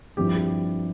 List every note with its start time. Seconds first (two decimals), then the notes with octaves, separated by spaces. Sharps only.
0.17 G2 F3 C4 E4 G4
0.35 G4